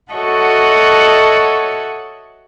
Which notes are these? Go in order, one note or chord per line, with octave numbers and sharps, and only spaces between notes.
F#4 A4 C#5 D#5 E5 F#5